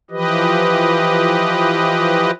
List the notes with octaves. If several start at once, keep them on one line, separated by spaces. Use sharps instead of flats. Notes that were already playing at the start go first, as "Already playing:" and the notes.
E3 F3 G4 B4 D#5